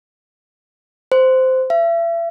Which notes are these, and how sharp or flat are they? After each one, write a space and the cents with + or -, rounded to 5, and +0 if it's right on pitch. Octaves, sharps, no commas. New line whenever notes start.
C5 -10
E5 +35